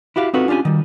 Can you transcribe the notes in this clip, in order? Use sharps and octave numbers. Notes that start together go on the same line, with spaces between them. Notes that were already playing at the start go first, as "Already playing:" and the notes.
E4 F#4 G4 F5
C4 D#4 F4 F#4 A4 B4
C#4 D4 F4 G4 G#5
D#3 G3